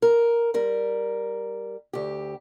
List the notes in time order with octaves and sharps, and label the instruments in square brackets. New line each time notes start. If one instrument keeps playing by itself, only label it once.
[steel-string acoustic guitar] A#4
G3 A#4
D2 G4